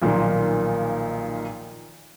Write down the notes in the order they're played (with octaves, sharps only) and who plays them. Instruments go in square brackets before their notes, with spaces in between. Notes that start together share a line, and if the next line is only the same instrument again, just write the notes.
[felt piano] B1 A#2 D#3 F3 A#3